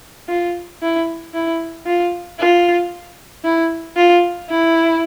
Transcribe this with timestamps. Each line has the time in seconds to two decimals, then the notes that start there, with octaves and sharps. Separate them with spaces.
0.28 F4
0.82 E4
1.34 E4
1.86 F4
2.39 F4
3.44 E4
3.97 F4
4.50 E4